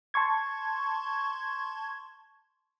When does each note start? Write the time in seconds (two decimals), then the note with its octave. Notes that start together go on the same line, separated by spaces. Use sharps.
0.14 A5 C6 C#6 G#6